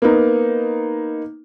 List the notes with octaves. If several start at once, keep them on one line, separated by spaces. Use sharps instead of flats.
A#3 B3 D#4